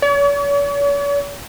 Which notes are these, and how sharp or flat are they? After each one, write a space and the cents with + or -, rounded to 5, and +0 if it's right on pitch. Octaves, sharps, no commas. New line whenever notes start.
C#5 +45